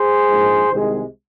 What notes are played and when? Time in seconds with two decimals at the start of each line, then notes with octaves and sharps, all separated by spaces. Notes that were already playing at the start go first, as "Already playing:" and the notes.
Already playing: G#4 C5
0.29 A#1 G#2 G#3
0.70 C2 C3 D#3 G#3